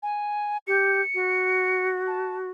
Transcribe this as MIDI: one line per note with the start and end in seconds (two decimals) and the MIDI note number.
0.03 0.58 80
0.67 1.01 67
0.67 1.88 97
1.15 2.50 66
2.07 2.37 81